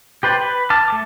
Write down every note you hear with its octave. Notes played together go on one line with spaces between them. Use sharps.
G4 B4 C5 D5
B4
A5 D6 F6
A3 A5 D6